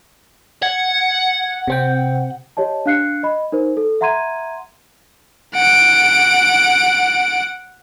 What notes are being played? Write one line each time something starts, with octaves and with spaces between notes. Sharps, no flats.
F#5 G#6
C3 C4 G5
G4 C#5 D#5 A5
D4 F5 F#6 C7 C#7
D#5 B5
D#4 A#4 C5
A4
E5 F#5 A#5 C6 G#6 D#7
F#5 D7